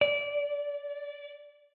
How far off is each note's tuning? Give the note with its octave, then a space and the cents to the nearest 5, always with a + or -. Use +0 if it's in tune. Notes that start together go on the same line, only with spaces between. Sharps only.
D5 -20